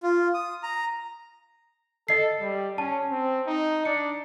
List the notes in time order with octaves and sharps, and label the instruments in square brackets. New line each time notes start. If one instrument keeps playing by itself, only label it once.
[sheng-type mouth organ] F4
D#6
A#5
[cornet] A4 [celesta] D#5 C7
[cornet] G3
[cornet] C#4 [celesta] A5
[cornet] C4
D#4
[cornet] D4 [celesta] C#7